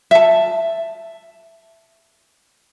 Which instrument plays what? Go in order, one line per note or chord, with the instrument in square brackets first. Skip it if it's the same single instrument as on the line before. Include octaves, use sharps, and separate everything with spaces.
[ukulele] E5 A5